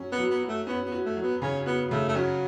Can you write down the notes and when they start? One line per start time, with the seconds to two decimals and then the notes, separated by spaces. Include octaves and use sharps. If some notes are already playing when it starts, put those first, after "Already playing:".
Already playing: F#3 C#4
0.12 B3
0.18 F#3
0.30 B3
0.43 F#4
0.48 A3
0.67 B3 C#4
0.86 B3
0.92 F#4
1.05 A3
1.16 F#3
1.23 B3
1.42 C#3 C#4
1.66 B3 F#4
1.91 C#3 A3
2.09 A3
2.16 F#3 C#4